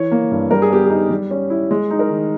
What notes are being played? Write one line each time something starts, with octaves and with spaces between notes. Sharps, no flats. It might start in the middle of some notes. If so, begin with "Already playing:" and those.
Already playing: E3 C#5
A#3
G2
G3 A#4
G#4
B3 G4
G#4
D#4
G3
C#4
E4
G#3
D#4
A#4
D#3